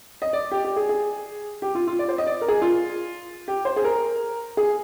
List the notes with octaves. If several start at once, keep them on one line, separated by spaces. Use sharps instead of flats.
D#5
D5
G4
G4
G#4
G#4
G4
F4
F4
D5
C5
D#5
D5
A#4
G#4
F4
G4
C5
G#4
A#4
G#4